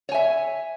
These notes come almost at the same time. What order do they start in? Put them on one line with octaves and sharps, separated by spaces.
C#5 G#5 E5